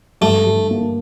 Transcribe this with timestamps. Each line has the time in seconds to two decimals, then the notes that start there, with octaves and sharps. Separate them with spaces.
0.21 G2 A3
0.46 G2
0.71 A#3